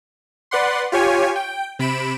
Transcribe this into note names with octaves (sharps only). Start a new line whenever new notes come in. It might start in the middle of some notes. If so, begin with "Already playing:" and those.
B4 D5 F#5 C6
F4 G4 C#5 G#5
G5
C3 B5 D7 E7